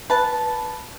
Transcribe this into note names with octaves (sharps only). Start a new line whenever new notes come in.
B4 A5